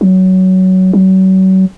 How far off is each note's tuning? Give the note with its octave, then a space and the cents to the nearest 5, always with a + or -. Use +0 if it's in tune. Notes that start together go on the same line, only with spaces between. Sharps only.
F#3 +15
F#3 +35